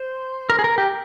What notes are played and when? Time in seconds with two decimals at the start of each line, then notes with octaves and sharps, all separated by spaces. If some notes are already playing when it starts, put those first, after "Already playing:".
Already playing: C5
0.50 A#4
0.59 G#4
0.64 A#4
0.78 G4